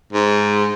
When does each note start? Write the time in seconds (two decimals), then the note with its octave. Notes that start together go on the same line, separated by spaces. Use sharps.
0.13 G#2